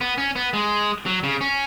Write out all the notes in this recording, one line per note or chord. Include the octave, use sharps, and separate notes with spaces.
B3
C#4
B3
G#3
F#3
C#3
C#4